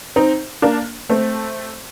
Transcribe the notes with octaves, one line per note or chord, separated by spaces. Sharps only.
C4 D#4
A#3 D4
A3 C4